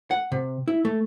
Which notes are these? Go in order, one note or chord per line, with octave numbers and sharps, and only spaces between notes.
F#5
C3
E4
A3